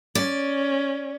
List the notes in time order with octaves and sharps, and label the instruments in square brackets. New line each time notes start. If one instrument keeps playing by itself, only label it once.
[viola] C#4 [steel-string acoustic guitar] D5